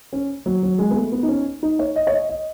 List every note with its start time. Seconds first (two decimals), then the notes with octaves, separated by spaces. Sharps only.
0.13 C#4
0.46 F#3
0.63 F#3
0.78 G#3
0.91 B3
0.96 A3
1.12 B3
1.23 D#4
1.29 C#4
1.63 D#4
1.79 C#5
1.96 D#5
2.07 C#5
2.12 D#5
2.29 D#5